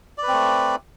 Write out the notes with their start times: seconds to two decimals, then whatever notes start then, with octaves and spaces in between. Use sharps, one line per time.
0.18 D5
0.23 B4
0.28 C4
0.33 A3